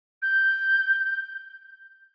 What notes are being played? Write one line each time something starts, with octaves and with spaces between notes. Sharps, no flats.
G6